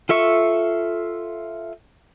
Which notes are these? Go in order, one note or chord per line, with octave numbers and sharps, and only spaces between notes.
F4 A4 E5 C#6